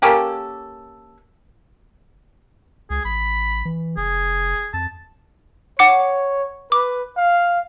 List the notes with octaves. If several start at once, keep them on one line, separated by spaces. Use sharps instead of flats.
A#3 C#4 G4 A4
C#2 G#4
A1 B5
E3
F1 G#4
F2 A5
C#5 F#5 D6 C#7
B4 D6
F5